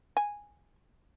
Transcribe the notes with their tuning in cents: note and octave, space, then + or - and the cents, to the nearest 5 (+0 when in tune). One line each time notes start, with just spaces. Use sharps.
G#5 -10